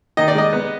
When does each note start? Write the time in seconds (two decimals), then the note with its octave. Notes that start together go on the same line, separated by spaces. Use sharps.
0.17 D#3 D#5
0.28 D5
0.35 G#3 D#5
0.53 B3